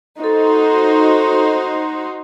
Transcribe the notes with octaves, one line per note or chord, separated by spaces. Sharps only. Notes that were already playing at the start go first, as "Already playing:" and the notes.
D#4 F#4 A4 C5 D#5